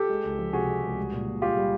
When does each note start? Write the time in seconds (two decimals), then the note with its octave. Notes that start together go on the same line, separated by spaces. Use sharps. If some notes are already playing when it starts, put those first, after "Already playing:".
Already playing: G4 A4
0.09 G#3
0.24 C#2
0.38 F3
0.53 C3 F#4 G#4
0.68 G#3
0.83 C#2
0.98 G3
1.12 A#2
1.27 A#2
1.42 G3 F4 G4
1.57 G3